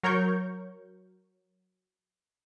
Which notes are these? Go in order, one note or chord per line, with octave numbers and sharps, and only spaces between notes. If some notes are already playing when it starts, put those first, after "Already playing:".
F#3 A#4 C#5 C#6 G6